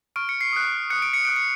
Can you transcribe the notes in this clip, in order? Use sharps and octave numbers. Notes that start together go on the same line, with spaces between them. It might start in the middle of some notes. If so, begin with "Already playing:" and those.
C#6 F6 D7
C#7
C7
D#6 F#6
D#6 F#6 C#7
D7
C#7
D#6 F#6 D7
C#7